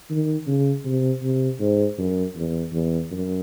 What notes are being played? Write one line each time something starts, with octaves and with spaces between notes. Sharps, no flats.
D#3
C#3
C3
C3
G#2
F#2
E2
E2
F#2